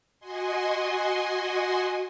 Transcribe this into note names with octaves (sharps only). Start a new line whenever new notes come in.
F#4 D#5 G#5 C6